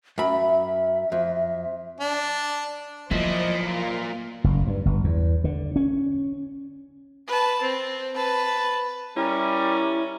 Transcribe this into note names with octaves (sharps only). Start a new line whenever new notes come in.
F#2 E5 B5
F2
D4
A#2 F3 F#3 E4 C5 D#5 D6
A#3 F4 A#4
F#1
G2
G1
E2
D3
C#4
B4 A5
C4
B4 A5
G3 C#4 E4 A#4